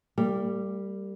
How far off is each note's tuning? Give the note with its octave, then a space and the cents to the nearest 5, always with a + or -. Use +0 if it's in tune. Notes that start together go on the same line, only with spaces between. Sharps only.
G3 +0 A#3 -45